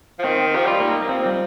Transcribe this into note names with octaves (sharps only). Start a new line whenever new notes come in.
F3
D#3 C4
F3 G4
G3 F4
A#3 D#4
A#3
F3 C4
G3